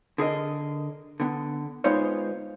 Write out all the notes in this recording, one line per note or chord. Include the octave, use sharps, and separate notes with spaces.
D3 G#4 A#4 D#5
D3 B3
G#3 B3 D#4 F4 C5 C#5